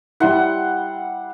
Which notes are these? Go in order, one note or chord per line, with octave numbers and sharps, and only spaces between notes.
G3 E4 F#5 C6